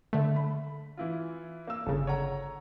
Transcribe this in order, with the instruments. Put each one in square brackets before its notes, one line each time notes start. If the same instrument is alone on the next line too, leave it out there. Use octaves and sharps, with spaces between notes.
[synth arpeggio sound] D3 A3
[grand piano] B5
E3 E4 F4
A#3 E6
[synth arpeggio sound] G1 C#3 [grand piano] A4
[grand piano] C#5 F#5 A#5